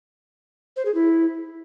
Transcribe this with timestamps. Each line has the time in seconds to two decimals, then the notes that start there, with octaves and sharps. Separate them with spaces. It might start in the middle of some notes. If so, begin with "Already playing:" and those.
0.76 C5
0.85 G#4
0.94 E4